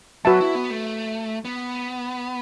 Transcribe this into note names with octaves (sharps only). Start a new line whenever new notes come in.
F#3 F#4 B4 E5 A5
E4
B3
A3
B3